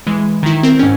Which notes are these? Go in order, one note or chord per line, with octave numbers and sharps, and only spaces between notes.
E3 G#3
D#3 E4
C4 A#4
G#2 C#4